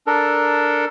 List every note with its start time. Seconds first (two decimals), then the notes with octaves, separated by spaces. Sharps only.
0.07 D4 A4 A#4